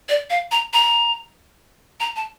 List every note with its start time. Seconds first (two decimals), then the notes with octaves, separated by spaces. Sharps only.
0.09 D5
0.30 F5
0.51 A#5
0.73 A#5
2.00 A#5
2.16 A5